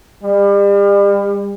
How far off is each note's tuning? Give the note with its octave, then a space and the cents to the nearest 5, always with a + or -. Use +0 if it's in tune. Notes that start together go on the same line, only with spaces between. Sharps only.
G3 +40